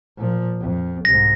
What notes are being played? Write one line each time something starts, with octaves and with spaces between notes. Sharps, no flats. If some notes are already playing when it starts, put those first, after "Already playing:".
A#2 F3
F2
C2 G#2 A#6